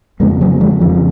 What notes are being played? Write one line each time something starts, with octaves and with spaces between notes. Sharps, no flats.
F2 C#3 G#3 B3
F#3 A#3
F3 G#3
F2 C#3 F3